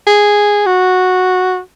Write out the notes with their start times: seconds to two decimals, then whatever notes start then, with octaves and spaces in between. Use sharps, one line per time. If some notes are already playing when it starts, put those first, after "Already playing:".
0.07 G#4
0.66 F#4